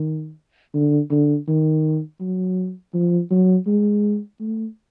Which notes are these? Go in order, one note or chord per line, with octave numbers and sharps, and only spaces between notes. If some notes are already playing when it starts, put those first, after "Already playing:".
Already playing: D#3
D3
D3
D#3
F#3
F3
F#3
G#3
A3